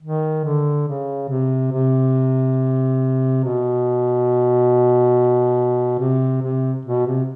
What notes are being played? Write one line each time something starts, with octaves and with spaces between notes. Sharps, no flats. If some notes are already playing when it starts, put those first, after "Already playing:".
D#3
D3
C#3
C3
C3
B2
C3
C3
B2
C3